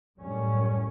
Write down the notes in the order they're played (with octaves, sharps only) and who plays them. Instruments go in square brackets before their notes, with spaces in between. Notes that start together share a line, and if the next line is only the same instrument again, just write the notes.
[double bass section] F#2 A2 G3 C#4